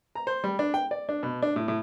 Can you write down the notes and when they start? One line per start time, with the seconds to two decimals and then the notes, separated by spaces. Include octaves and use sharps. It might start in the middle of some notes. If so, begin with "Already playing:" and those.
0.15 A#5
0.27 C5
0.44 G3
0.59 D4
0.74 G5
0.91 D5
1.09 D4
1.23 B2
1.42 D4
1.56 A2
1.68 A2